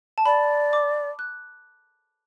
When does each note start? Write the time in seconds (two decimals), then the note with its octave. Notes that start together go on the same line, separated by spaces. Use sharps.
0.18 A5
0.26 D5 B5
0.73 D6
1.19 F#6